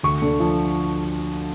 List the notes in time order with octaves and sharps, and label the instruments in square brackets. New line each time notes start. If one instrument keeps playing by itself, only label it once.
[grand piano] D2 C#6
D3
F3